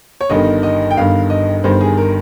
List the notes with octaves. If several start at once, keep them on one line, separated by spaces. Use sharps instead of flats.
C#5
G1 G2 D#3 D#5
D#5
G5
G1 G2 D#3 F5
D#5
G1 G2 D#3 C5
G#4
A#4